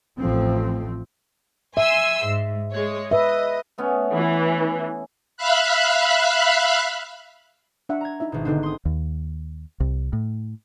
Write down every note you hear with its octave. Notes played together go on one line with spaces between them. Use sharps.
A1 F2 F3 A3 C4
E5 G#5 C6 E6
G#2
G#3 C#5
B4 D#5 E5
A3 B3 C#4
E3
E5 F5 B5 F#6
D4 E5 F#5
A#5 G#6
D#4 E4 E5
G#1 B2
D3 B3 C4 D4 D#4
C6 D#6
D#2
C2
A2